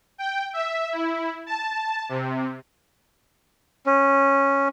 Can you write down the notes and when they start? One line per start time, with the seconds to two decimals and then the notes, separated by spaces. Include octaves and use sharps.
0.18 G5
0.53 E5
0.92 E4
1.46 A5
2.09 C3
3.86 C#4